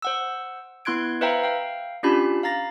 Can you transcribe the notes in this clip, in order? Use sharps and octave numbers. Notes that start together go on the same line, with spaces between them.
C5 F#5 E6
B3 E4 C6 F#6 G#6 D7
B4 C5 E5 F5 G5 A#5
F5 G5
C#4 D4 F4 G4 A5 B5
F5 A#5 A6 A#6